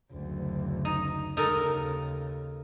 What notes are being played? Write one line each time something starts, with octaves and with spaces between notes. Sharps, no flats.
F#1 D2
D#4
D#2 C#3 D#4 A4 A#4